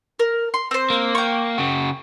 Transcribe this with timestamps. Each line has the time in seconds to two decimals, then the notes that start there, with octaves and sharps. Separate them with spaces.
0.19 A#4
0.54 C6
0.71 C4 C5
0.90 A#3
1.15 G5 C#6
1.58 C#3 F#4